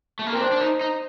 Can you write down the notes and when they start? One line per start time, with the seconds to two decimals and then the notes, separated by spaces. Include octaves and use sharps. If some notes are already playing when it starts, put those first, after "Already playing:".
0.19 A3
0.27 A#3
0.33 C4 A#4
0.41 D4 C5
0.52 D4
0.61 D#4
0.81 D#4